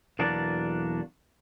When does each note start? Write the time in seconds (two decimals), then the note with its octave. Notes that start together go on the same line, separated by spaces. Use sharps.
0.19 B1 E2 A#3 D4 F#4 D5